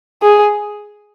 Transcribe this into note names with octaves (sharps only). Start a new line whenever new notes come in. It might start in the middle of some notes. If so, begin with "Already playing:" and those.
G#4